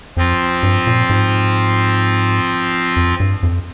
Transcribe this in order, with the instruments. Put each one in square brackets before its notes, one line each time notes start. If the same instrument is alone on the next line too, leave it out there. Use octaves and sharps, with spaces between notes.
[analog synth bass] F2 [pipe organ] F3 C4 F4
[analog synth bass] G2
A#2
G#2
F2
G2
F2